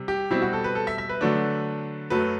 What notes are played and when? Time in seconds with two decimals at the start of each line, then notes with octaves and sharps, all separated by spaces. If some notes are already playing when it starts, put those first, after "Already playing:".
Already playing: C3 G3
0.08 G4
0.31 B2 G3 C4 E4
0.42 F#4
0.53 A4
0.64 B4
0.75 A4
0.87 E5
0.98 E5
1.09 B4
1.21 D3 F#3 A3 D4
2.10 F#2 F#3 A3 B4